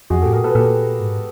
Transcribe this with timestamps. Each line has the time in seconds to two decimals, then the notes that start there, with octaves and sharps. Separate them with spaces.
0.10 F2 F#4 G#4
0.22 A2 G4 A4
0.33 G#4 A#4
0.40 A#2 A4 B4
0.55 A#2 G4 A4
1.00 G#2